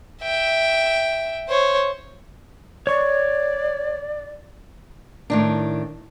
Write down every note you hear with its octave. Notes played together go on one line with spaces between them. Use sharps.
E5 G5
C5 C#5
C#5 D5 C#6
A2 D#3 D4